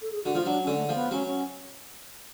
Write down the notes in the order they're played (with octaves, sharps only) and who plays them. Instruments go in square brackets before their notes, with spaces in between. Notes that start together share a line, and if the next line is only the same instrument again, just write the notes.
[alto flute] A4
G#4
[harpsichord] D3 [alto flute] F#4
[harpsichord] F3 [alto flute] F4
[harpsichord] F#3 [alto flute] D4
[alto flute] C#4
[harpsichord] D3
[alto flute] A3
[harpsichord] F3 [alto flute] A3
[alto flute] B3
[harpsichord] F#3 [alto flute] C#4
[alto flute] C#4